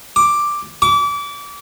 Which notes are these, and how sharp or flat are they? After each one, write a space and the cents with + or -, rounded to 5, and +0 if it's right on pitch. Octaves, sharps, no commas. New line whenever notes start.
D6 +5
D6 -30